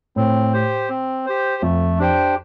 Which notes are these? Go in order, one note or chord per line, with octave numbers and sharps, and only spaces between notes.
A2 C4
G4 C5
C4
G4 C5
F2 A3
D4 G4 C5 G5